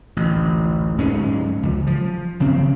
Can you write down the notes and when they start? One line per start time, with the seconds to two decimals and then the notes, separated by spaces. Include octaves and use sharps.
0.16 A1 D2
0.98 D1 G#2 G#3 C#4
1.63 C#2 F3
1.87 F3
2.40 G1 C#3 C4 C#4